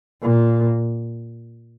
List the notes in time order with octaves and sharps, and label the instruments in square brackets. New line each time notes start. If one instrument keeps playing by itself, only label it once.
[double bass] A#2